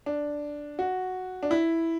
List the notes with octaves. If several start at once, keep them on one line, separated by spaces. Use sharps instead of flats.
D4
F#4
D4
E4